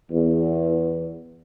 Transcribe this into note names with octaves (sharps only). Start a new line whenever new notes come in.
E2